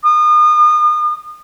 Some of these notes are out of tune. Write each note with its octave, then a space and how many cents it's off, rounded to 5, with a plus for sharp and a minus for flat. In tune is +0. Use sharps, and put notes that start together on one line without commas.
D#6 -35